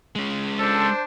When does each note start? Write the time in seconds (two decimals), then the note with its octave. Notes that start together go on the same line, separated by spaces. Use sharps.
0.16 G#3 C#4
0.59 D4 A4 C5